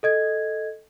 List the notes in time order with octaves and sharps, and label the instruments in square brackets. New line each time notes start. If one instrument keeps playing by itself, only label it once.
[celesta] A4 D#5 G#6